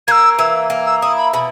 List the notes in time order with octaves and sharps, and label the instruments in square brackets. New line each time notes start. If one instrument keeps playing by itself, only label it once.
[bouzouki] A#3 [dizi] E6 G#6
[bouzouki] E3 [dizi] E6
[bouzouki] A#3
[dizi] E6
[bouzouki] E4 [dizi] D#6
[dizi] B5
[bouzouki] B2 [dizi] B5